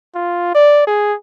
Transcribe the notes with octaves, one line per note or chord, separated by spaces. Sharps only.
F4
D5
G#4